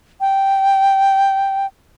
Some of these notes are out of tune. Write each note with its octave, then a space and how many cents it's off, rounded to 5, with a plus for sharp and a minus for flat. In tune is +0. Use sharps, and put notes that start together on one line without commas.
G5 -5